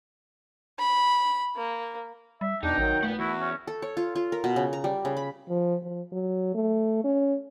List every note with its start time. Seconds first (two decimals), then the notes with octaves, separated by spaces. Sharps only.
0.79 B5
1.57 A#3
2.41 G3 E5
2.63 E2 B2 D4 D#4 G5
2.77 A1 D#3 F#3
3.03 A#2 A3 B4 F#5
3.19 E2 E4 F#4
3.40 C#4
3.67 A4
3.82 C#5
3.97 F4
4.15 F4
4.32 A#4
4.44 B2
4.56 C#3
4.73 A#5
4.84 G3
5.05 C#3
5.17 B5
5.49 F3
5.83 F3
6.12 F#3
6.55 A3
7.04 C#4